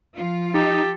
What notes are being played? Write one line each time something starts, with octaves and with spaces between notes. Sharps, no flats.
F3 F4
D#4 G4 A4